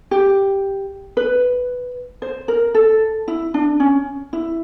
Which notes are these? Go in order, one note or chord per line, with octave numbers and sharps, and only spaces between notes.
G4
B4
C5
A#4
A4
E4
D4
C#4
E4